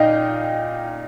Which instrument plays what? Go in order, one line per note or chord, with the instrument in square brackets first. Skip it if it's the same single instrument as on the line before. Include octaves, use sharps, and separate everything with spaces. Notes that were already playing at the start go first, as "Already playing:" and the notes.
Already playing: [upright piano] A#2 D#4 D#5 F5 G5